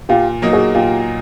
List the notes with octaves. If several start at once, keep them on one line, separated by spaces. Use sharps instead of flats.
A#2 F4 G4
F#3 A#3 D#4
F#4 G#4
A#2 F4 G4